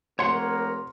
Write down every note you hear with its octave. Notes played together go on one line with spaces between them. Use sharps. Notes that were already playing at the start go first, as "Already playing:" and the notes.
F1 A#3 A#4 C#5 F#5 C6